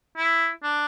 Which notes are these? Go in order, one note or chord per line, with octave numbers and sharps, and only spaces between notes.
E4
D4